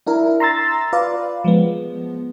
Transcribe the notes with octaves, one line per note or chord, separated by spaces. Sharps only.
D4 E4 A#4
A#5 C6 E6 A6
F4 B4 D5 F5
F3 G#3 B3